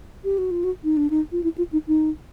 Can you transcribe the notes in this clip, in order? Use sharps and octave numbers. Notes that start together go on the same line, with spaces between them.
G4
F#4
F4
F#4
D#4
D4
D#4
F4
E4
F4
D#4
D#4